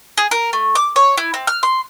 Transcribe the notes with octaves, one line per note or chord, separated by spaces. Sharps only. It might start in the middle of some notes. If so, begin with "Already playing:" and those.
G#4
A#4
A3
D6
C#5
E4
C4
F6
C6